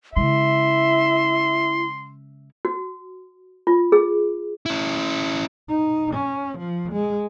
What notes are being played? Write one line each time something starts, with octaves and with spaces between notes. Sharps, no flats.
C#3 G#3 E4 E5 C6
F#4
F4
G#4
C#4 E4
D#4
C#4
F3
G#3